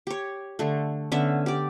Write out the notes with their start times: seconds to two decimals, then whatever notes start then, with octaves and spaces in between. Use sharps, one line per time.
0.07 G4 C#5
0.59 D3 A3
1.12 D3 B3 C#4 E5
1.46 G4 D5